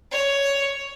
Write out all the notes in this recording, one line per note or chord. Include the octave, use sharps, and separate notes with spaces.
C#5